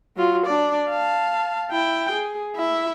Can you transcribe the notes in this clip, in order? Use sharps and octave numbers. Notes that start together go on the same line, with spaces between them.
F#3 F4
D4 D5
F5 A5
E4 G5
G#4
E4 E5